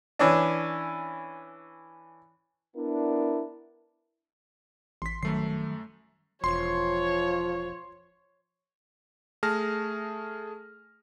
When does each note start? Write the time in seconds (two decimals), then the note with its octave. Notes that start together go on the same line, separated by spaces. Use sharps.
0.19 E3 C#4 D4
2.76 B3 D4 E4 A#4
5.02 A1 C6 B6
5.23 F#2 D#3 F#3 G3 A3 C7
6.44 E1 F3 C#5 C6
9.43 A3 G#4 A5 F6 A#6